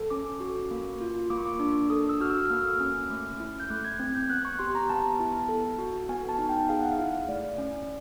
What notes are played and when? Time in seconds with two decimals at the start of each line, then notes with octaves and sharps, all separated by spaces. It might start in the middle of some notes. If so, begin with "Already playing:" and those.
Already playing: A4
0.10 C#4 D6
0.40 F#4
0.71 A#3
1.01 F4
1.30 A#3 D6
1.38 C#6
1.46 D6
1.59 D4
1.90 A4 D#6
2.09 E6
2.20 F#4 F6
2.30 E6
2.46 E6
2.50 A#3 F6
2.80 C#4
3.10 A3
3.40 E4
3.60 G6
3.70 A3 F#6
3.85 G#6
4.00 C4 G#6
4.15 G6
4.29 B3 F#6
4.45 C#6
4.59 G4 C6
4.75 A#5
4.89 B3 A5
5.20 E4
5.49 A4
5.79 F#4
6.09 B3 G#5
6.29 A5
6.38 D#4
6.49 G5
6.69 G#4 F5
6.81 F#5
6.92 F5
6.99 E4
7.28 A3 D5
7.58 C#4